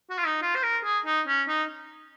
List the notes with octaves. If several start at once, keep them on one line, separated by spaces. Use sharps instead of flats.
F#4
F4
D#4
F4
C5
A#4
G#4
D#4
C#4
D#4